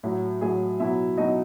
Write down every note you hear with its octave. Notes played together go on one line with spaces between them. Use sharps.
A2 F#3
A2 F#3 G#4 G#5
B2 F#3 E4 E5
B2 F#3 D#4 D#5